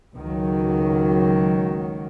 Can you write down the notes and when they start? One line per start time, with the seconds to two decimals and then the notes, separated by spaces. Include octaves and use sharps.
0.14 C#2 D#3 F#3